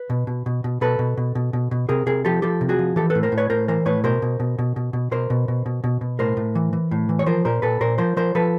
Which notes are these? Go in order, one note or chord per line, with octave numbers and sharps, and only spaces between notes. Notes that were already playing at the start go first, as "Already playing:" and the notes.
Already playing: B4
B2
B2
B2
B2
B2 A4 B4
B2
B2
B2
B2
B2
C3 G#4 A#4
C3 G#4 A#4
F3 G4 A4
F3 G4 A4
C3
F#4 G#4
F3
E3 G4 A4
A4 B4
A2
A#4 C5
A2
B4 C#5
A2 A#4 C5
E3 A#4 C5
A2 B4 C#5
B2 A#4 C5
B2
B2
B2
B2
B2
B2 A#4 C5
B2
B2
B2
B2
B2
A2 A#4 C5
A2
E3
E3
A2
E3
C#5
F3 A#4 C5
A#2 A#4 C5
A#2 A4 B4
A#2 A#4 C5
F3 A#4 C5
F3 A#4 C5
F3 A4 B4